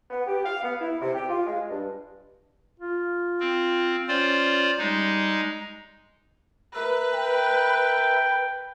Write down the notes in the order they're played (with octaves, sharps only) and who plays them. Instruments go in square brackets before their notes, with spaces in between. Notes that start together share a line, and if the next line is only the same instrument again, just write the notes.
[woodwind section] B3
G4
F5
B3
E4
C3
G4
F4
G#3
G2
[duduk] F4
[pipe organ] C4
[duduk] C#4 [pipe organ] F4 C5 D5
[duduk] G3 [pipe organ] G#3 D#4
[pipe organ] A#4 E5 [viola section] B4
[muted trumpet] G5